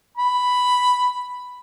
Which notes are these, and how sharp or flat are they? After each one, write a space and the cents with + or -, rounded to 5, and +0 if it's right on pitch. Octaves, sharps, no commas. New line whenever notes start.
B5 +5